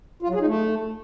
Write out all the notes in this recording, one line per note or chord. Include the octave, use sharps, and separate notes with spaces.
F4
F#3
G#4
D#4
A3